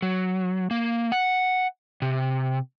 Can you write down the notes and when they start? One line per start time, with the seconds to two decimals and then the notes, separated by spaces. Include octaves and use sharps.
0.02 F#3
0.71 A#3
1.12 F#5
2.02 C3